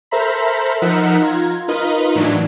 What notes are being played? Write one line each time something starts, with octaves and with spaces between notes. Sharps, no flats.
A4 A#4 C5 E5 A#5 B5
F3 D#4 A#4 F#5 E6 B6
F4 A#5 G#6
D#4 F4 A#4 B4 D#5
A2 E3 F#3 D4